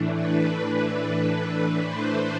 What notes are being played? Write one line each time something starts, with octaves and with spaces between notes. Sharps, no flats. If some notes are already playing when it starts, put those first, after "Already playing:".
Already playing: A2 E3 A3 D4
B4
B4
C5